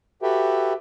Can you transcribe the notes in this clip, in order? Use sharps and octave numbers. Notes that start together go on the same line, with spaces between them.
F#4 G4 A4 B4 E5 G5